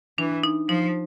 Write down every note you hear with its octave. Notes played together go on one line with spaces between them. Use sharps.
E3 D4
D#4
F3 D#4